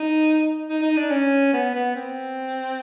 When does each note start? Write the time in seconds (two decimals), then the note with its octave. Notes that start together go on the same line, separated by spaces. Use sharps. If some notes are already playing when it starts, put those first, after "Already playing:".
Already playing: D#4
0.69 D#4
0.82 D#4
0.97 D4
1.11 C#4
1.53 B3
1.75 B3
1.96 C4